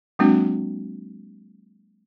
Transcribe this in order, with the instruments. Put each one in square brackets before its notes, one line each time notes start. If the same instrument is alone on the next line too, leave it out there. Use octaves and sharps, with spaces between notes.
[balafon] F#3 G#3 A#3 C4 D4 F#4